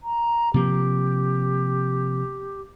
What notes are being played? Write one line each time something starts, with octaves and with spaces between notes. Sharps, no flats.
A#5
C3 F3 A#3 G4